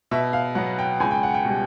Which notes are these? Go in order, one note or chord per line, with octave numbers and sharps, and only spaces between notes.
B2 E5
F5
F#3 B3 F#5
G5
C#2 G#5
G5
F#5
G5
B2 G3